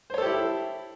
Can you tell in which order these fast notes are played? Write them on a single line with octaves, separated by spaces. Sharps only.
C5 C#5 A4 G4 E4